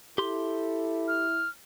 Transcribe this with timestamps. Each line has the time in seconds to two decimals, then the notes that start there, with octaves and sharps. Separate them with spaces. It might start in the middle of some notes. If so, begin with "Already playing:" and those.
0.18 E4 G4 A4 C6
1.08 F6